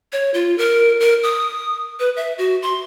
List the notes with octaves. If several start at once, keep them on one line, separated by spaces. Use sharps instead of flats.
C#5
F4
A#4
A#4
D#6
B4
E5
F#4
C6